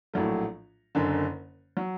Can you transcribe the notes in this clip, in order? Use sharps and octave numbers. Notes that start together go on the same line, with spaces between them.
A#1 A2 F#3 A3
F#1 F#2 D3
F#3